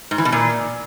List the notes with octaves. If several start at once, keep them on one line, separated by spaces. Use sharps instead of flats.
G#2
E3
B2
A#2